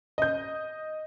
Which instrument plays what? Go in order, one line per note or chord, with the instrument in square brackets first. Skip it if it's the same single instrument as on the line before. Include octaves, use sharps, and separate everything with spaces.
[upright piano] D#5 G6